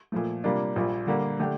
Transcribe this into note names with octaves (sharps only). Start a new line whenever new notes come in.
A#2 F3 A3
C3 G3 A#3 D4 F4
A#1 A#2 G3
D3 G3 A#3
D3 A3 D4 G4